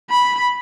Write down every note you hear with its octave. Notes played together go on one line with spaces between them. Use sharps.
B5